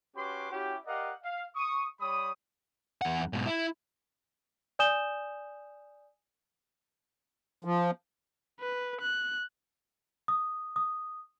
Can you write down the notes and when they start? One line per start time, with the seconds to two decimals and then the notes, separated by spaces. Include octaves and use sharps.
0.15 C#4 F#4 G4 B4 C6 D6
0.51 C#4 E4 F#4 G4
0.86 G4 A#4 D5 D#5 F5 F#5
1.23 F5
1.55 C#6 D#6
2.00 G3 C#5 B5 D#6
3.01 E2 F#5
3.33 G#2 B2
3.46 E4
4.79 D5 G#5 D#6 G6 E7 G7
7.64 F3
8.61 B4
9.01 F#6
10.28 D#6
10.76 D#6